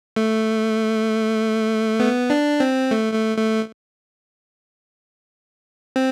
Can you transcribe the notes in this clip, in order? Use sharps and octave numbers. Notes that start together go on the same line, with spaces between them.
A3
B3
D4
C4
A3
A3
A3
C4